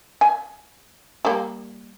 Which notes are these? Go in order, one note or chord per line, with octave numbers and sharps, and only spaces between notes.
G#5
G3 A#3